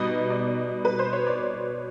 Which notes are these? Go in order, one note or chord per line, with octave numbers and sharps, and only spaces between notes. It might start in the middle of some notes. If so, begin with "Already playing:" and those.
Already playing: B2 G3 B3 D#4 D#5
D5
B4
C5
C#5
D5